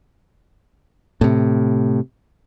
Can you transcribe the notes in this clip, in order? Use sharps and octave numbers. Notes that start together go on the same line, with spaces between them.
A2 C3